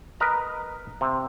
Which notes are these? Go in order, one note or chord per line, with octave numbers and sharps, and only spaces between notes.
A#4 B4 D#5 A#5
C3